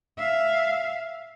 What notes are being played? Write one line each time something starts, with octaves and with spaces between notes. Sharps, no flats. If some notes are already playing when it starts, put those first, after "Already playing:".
E5 F5